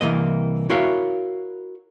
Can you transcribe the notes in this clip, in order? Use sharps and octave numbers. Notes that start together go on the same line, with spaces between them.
C2 E3 A#3 D#5
E4 F#4 A#4 C#5 E5 F5